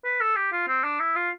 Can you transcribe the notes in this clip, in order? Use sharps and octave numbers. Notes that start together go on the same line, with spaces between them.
B4
A4
G4
F4
C4
D4
E4
F4